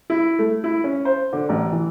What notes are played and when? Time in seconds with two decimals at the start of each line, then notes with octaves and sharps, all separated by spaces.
0.10 E4
0.39 A3
0.64 E4
0.84 C#4
1.05 C5
1.33 D3
1.49 A1
1.72 E3